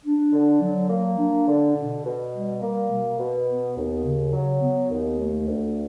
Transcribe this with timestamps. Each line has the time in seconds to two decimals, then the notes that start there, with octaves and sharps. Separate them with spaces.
0.04 D4
0.32 D3
0.61 F#3
0.89 A#3
1.18 D4
1.48 D3
1.76 B2
2.04 B2
2.33 G3
2.61 A#3
2.90 B2
3.18 B2
3.48 B3
3.77 D#2
4.05 C#3
4.33 F#3
4.61 B3
4.91 D#2
5.20 A3
5.48 D2